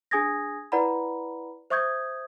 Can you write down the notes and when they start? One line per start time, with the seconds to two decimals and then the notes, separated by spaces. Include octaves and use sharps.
0.11 D4 G#4 G#5 D#6 G#6 A#6
0.72 E4 B4 D5 F#5 A#5 B5
1.70 C5 E5 C#6 D#6 G6 G#6